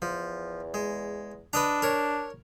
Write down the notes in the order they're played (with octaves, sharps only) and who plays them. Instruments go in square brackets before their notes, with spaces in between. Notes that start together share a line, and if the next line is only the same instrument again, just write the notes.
[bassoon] E2 [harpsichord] F3
[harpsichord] G#3
[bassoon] D4 [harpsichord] B4 D#5 A#5
[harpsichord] A#4 C#5